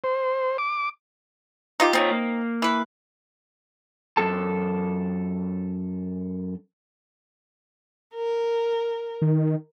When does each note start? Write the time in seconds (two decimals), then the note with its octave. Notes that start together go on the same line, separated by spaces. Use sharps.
0.04 C5
0.58 D6
1.80 D#4 F4 G4
1.93 A#2 C4 D#4 F4 C#5
2.11 A#3
2.62 E3 B4
4.17 F#2 A4 A5
8.15 A#4
9.22 D#3